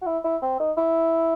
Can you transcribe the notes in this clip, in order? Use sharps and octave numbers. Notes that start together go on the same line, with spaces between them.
F#4
E4
E4
C4
D#4
E4